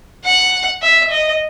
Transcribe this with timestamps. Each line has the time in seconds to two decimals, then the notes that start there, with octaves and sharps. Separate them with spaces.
0.24 F#5
0.82 E5
1.11 D#5